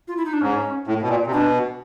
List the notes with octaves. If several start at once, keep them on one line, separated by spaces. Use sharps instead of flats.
F4
E4
D#4
D4
G#2 C#4
A2
B2
A#2
C3
B2 D4